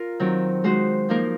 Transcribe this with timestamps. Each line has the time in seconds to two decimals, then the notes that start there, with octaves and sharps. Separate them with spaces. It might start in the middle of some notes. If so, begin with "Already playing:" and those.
Already playing: F4 A#4
0.20 D#3 F#3 C4
0.64 G#3 D#4 F#4 C5
1.09 F3 A#3 D#4 A#4